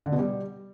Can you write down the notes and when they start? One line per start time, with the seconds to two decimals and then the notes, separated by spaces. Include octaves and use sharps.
0.06 D3
0.12 B2
0.19 G3